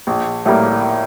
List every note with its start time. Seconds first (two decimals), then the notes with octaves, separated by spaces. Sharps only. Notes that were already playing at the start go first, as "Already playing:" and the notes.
0.07 A#1
0.46 A2 G3 A#3